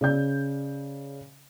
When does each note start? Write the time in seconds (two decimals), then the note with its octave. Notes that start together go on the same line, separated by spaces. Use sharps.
0.01 C#3 D5 G6